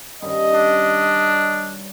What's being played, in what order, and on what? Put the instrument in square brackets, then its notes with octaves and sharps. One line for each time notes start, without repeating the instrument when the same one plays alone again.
[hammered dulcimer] G2 D#3 C#4 [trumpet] D#5
[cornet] D4